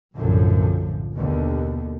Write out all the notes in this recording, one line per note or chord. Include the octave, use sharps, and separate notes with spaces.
B1 F#2 A2 D3 F3
D#2 B2 D3